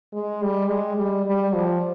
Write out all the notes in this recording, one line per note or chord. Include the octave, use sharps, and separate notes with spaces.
G#3
G3
G#3
G3
G3
F3